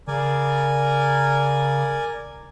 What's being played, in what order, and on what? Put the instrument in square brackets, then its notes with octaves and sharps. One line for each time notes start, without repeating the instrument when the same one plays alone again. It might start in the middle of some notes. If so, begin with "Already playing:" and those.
[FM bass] C#3 [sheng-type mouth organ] A#4 D5 G#5